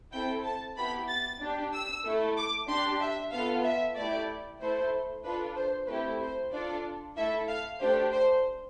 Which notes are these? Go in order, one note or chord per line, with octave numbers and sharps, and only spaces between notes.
C4 E4 A4 G5
A5
B3 E4 G4 B5
A6
D4 G4
E6
A3 E4 A4
D6
D4 G4 C6
E5
B3 F4 A4 F5
E5
A3 E4 G4 D5
A3 E4 A4 C5
D4 F4 A4 B4
C5
A3 C4 E4 G4 B4
C5
D4 F4 A4 D5
A3 E4 A4 E5
F5
A3 D4 G4 C5
C5